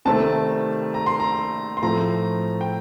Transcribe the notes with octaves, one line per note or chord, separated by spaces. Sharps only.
C2 C3 D#3 A3 C4 A5
A#5
C6
A#5
C6
A2 F3 A3 C4 A#5
G5